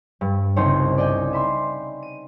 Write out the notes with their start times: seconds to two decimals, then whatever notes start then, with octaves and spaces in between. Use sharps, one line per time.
0.21 G2
0.56 G1 C2 C#3 D#4 C5 C#5
0.98 D5 D#5 G5 G#5
1.33 E5 B5 C6
2.03 D#7